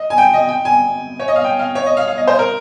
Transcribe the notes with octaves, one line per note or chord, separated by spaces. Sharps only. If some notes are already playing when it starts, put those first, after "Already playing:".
Already playing: D#5
G#5
G5
D#5
G5
G#5
C#5
D#5
F5
G5
F5
C#5
D#5
F5
F5
D#5
C5
A#4